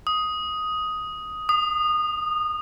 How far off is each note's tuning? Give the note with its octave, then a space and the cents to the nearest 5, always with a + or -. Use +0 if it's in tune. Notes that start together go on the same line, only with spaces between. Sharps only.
D#6 +5
D#6 -25